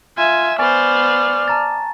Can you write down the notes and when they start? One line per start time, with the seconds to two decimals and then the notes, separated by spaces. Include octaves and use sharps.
0.18 F4 E5 G#5
0.59 B3 C5 D5 G#5 C#6 F6 A6
1.48 A5 A#5 A6